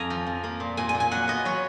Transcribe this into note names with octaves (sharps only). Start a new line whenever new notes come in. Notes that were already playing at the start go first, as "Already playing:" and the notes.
Already playing: F2 G#5 A#5
F3
F2
A#3
A#2
A#2 G#5
G#5
A#2
G#5
F#3 F#5
B3 D#5
F#3 C#5